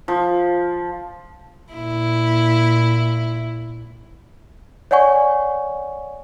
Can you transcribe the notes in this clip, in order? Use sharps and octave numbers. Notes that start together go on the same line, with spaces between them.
F3
A#2 E4
C#5 D5 F#5 G#5 C#6